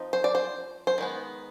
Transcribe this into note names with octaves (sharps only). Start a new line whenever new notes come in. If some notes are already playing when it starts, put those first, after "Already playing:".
Already playing: F3 C4 D#4
C5
D5
C5
C5
D#3 G#3 B3